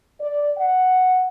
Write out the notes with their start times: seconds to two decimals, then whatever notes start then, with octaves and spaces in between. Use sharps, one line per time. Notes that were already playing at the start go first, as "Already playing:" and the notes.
0.20 D5
0.57 F#5